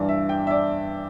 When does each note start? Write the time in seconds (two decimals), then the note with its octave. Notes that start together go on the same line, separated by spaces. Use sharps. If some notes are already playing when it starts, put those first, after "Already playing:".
Already playing: G2 E3 D5
0.09 E5
0.29 G5
0.47 E5
0.51 D5